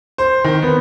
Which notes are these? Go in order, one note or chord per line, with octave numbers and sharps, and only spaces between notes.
C5
D#3
B3